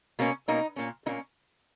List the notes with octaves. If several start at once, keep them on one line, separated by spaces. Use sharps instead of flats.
B2 A#3 C#4
B2 A#3 C#4 D#4
A#2 A#3 C#4
A#2 A#3 C#4 D#4